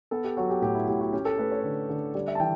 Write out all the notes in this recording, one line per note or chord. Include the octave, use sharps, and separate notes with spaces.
B3 A4
G4
F#3 F#4
G4
A2 G4
E4
A2 G4
F#4
C#4 G4
A4
A3 B4
C#5
D3
D3
G3 D5
E5
A5
E3 G5